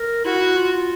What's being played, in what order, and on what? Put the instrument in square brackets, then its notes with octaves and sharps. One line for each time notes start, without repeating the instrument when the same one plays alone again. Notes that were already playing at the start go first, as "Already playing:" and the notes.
Already playing: [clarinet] A#4
[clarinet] E4 [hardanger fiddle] F#4
[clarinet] E4
F4
F4